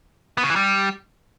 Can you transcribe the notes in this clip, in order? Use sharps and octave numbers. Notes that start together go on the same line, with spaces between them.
B3
C#3
E3
G3